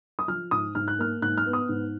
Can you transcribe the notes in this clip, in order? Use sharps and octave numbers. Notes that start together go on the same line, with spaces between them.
D#6
F3 F6
G#2 D#6
G#2 F6
F#6
A#3 F6
G#2 F#6
F6
B3
D#6
G#2